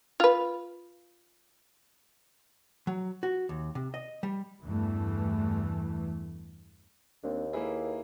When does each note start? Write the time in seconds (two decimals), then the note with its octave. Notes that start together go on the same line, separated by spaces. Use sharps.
0.20 F4 B4
2.87 F#3
3.23 F#4
3.49 D#2
3.75 C3
3.94 D#5
4.23 G3
4.63 E2 G2 E3 A3
7.24 D#2 A#3 C4 D4
7.53 A#3 E4 G#4 A#4 B4 E5